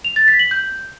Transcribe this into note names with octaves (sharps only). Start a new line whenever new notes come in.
F7
A6
B6
F#7
G6